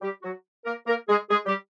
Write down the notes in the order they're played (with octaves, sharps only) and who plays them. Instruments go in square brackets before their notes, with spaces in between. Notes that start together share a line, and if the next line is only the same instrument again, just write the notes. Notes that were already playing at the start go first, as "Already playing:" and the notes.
[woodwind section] G3 G4
F#3 F#4
A#3 A#4
A#3 A#4
G#3 G#4
G#3 G#4
G3 G4